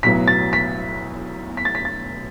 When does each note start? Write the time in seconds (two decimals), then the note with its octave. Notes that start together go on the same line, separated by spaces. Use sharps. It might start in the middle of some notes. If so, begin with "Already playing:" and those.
0.03 B1 A2 F#3 B3 B6
0.28 A6
0.53 B6
1.57 B6
1.65 A6
1.75 B6
1.85 A6